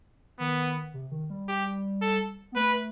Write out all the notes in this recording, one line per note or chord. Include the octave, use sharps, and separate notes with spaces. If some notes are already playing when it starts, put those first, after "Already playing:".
D#3 B3
C3
D#3
G3
G4
A4
B3
A3 B4